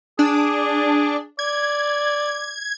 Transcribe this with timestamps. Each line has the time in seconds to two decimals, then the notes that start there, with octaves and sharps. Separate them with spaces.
0.19 D4 G#4
1.39 D5 G#6